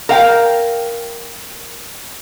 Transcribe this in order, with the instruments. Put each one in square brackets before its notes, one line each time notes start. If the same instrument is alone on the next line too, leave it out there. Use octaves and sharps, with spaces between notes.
[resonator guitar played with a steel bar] A#4 F5 G5